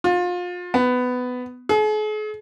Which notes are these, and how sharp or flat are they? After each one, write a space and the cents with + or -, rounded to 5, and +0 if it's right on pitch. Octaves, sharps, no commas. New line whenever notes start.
F4 +30
B3 +15
G#4 +45